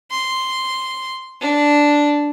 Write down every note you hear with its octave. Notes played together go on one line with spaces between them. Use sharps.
C6
D4